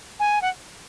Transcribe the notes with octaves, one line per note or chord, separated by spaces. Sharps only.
G#5
F#5